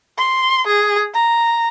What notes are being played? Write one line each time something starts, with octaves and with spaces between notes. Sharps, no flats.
C6
G#4
A#5